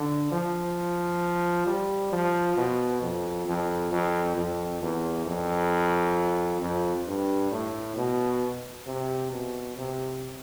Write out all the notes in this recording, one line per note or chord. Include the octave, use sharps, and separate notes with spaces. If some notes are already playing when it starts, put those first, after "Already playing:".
Already playing: D3
F3
G3
F3
B2
F2
F2
F2
F2
E2
F2
F2
G2
A2
B2
C3
B2
C3